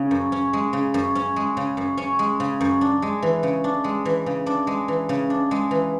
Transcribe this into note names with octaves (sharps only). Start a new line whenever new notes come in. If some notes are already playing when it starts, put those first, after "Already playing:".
Already playing: C#3 C#4
F#2
C#4
G#3
C#3
F#2
C#4
G#3
C#3
F#2
C#4
G#3
C#3
F#2
D4
G#3
E3
C#3
D4
G#3
E3
C#3
D4
G#3
E3
C#3
D4
G#3
E3